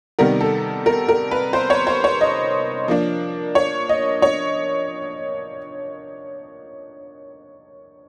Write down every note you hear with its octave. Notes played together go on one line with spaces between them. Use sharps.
C3 D#3 G3 B3 A#4
A4
A#4
A#4
B4
C5
C#5
C5
C#5
D#5
F3 A#3 D4
C#5
D#5
C#5